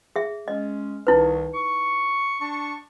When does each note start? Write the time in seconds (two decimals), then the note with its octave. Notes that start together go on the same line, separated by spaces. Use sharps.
0.16 G#4 E5
0.48 G#3 C#4 D#5
1.07 C2 D#3 D#4 E4 B4
1.55 C#6
2.39 D4 A5 C#6